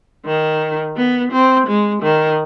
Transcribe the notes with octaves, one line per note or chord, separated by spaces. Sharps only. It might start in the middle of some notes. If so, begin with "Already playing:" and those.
D#3
B3
C4
G#3
D#3